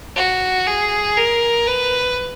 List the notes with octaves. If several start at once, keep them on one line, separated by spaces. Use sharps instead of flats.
F#4
G#4
A#4
B4